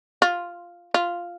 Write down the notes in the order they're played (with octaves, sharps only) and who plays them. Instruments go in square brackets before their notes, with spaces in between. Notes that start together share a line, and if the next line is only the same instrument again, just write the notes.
[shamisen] F4
F4